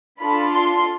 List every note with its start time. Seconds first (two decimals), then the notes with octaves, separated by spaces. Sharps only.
0.21 D4 F4 A4 B5
0.53 C6